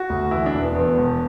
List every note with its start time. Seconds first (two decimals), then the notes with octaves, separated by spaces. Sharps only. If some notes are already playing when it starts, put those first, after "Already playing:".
Already playing: F#4
0.10 D2
0.31 E3 E4
0.46 D4
0.54 E1
0.61 B3
0.75 E2 B3
0.98 E1